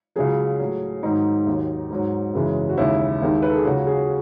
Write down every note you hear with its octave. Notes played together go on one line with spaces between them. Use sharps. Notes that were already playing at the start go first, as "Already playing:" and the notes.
C#2 C#3 F#3 G#4
A2 F#3
G#2 D#3 F#3 D#4
D#2 D#3 F#3
G#2 F#3
F#2 C#3 E3 G#3
F#4
D#2 C#3 E3 G#3 E4
D#2 D#3 G#3
B4
A4
G#4
C#2 C#3 F#3 F#4
G#4